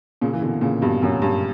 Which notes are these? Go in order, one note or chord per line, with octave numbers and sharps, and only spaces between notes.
A#2 C#3
E3
B2 D3
A#2 C#3
G2 B2
F#2 A#2
G2